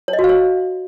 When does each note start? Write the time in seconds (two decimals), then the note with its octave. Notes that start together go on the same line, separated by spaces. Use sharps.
0.08 C#5
0.13 D#5
0.19 F#4
0.24 F5
0.29 C#5